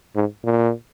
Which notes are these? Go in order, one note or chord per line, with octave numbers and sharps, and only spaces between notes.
G#2
A#2